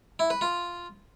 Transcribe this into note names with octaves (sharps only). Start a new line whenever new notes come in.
E4
B4
F4